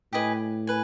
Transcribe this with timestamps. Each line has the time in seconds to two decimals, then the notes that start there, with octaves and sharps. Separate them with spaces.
0.13 A2 G4 B4 D#5 G#5
0.67 B4 G#5